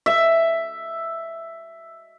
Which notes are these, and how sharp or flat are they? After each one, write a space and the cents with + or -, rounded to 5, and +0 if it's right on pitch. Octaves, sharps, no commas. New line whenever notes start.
E5 +5